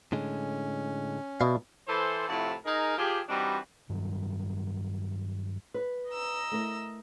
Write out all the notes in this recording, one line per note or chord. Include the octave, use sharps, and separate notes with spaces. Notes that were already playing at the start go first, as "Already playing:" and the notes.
A2 D3 G#3 C#4
B2 D5 E5 F5
E3 A4 C5
A2 C3 F3 E4 F#4 A5
D#4 G#4 A#4
F3 G4 G#4
E3 G3 C4 D4 D#4 F#4
G2 D#3 F#3 G3
B4
D#5 A#5 E6
A3 E4 A#4